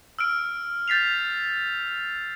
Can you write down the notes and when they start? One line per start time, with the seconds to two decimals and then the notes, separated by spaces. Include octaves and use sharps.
0.19 E6 F6 D7
0.88 G6 A6 B6 C7 F7